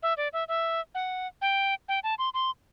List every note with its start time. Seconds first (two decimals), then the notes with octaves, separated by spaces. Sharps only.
0.03 E5
0.17 D5
0.33 E5
0.48 E5
0.95 F#5
1.42 G5
1.89 G5
2.04 A5
2.19 C6
2.34 C6